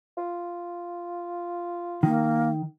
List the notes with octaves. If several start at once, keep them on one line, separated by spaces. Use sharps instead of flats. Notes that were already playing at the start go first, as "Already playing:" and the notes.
F4
D#3 A#3